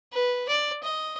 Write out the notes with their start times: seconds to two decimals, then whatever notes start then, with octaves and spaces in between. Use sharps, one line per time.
0.13 B4
0.49 D5
0.84 D#5